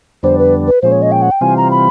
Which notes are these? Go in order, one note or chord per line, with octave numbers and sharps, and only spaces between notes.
F2 D3 G3 B3 D4 C5
B4
B4
A#2 F3 G#3 C#4 C5
C#5
D#5
G5
F#5
G5
C3 E3 G3 C4 F4 G#5
A#5
B5